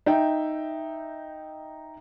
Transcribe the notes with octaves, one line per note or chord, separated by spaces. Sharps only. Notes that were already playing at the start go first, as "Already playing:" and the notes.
D#4 E5 G5